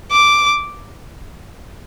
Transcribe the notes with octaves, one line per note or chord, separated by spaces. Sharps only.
D6